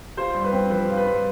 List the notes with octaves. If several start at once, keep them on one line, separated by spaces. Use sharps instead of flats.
F4 C5
G2
B4
C4
F3 B4
F4
B4
G2